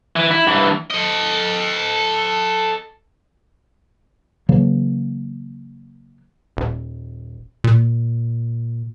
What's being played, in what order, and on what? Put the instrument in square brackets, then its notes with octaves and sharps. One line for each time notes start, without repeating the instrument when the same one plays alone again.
[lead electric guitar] E3
E4
G2 E3
[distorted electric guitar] A4 D#5
[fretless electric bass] C#3 E3 F#3 A#3
[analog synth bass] D#1
A#2